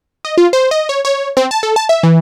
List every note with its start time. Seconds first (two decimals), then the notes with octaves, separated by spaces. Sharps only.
0.25 D#5
0.38 F4
0.53 C5
0.71 D#5
0.89 C#5
1.05 C#5
1.37 C4
1.51 A5
1.63 A4
1.76 A5
1.89 E5
2.03 E3